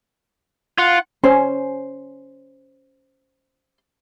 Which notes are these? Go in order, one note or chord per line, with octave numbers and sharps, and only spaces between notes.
F4 F#5
C#4 C5